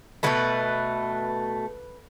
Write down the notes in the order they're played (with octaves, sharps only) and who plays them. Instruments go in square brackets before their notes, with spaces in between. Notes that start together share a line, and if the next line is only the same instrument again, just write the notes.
[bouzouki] B2 F#3 A3 B4